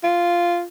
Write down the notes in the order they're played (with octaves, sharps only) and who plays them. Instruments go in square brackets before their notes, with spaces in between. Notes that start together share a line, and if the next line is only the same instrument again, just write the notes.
[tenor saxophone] F4